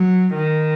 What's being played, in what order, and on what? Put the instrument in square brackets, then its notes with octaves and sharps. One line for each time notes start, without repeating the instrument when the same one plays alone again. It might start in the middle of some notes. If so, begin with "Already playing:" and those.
Already playing: [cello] F#3
D#3